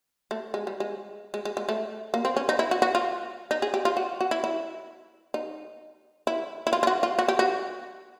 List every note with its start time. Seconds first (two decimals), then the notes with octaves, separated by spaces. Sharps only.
0.31 A3
0.54 G#3
0.67 G3
0.80 G#3
1.34 G#3
1.45 G#3
1.57 G#3
1.69 A3
2.14 A#3
2.25 C4
2.37 C#4
2.49 D#4
2.59 E4
2.71 F#4
2.82 F#4
2.95 F4
3.51 D#4
3.62 G#4
3.74 G4
3.85 F4
3.97 F#4
4.21 F#4
4.31 E4
4.44 E4
5.34 D#4
6.27 E4
6.67 E4
6.73 F4
6.83 F4
6.87 F#4
7.03 F4
7.19 F#4
7.28 G4
7.39 F#4